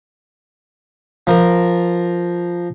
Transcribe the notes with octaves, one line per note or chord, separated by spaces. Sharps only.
F3 A#4